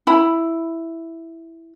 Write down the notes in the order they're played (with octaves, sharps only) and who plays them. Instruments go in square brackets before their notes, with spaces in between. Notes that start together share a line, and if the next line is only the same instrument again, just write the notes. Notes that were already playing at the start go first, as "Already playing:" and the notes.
[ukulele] E4 B5